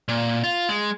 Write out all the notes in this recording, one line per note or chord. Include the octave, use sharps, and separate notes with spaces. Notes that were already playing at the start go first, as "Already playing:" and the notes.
A#2
F4
G#3